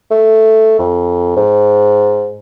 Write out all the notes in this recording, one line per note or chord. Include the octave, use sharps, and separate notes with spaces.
A3
F2
G#2